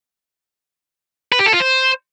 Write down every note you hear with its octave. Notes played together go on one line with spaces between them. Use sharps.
B4
G4
A4
F4
C5